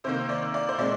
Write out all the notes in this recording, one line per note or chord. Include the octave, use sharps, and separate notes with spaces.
C3 D#3 A#3 C5
D5
D5
C5
A#2 G#3 C4 D5